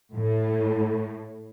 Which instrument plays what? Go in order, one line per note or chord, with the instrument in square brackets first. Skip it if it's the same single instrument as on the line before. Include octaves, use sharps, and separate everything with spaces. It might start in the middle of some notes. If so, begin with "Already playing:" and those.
[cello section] A2